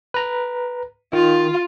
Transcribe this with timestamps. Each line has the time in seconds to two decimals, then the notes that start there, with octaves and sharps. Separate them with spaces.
0.14 B4 A#5
1.13 D#3 F4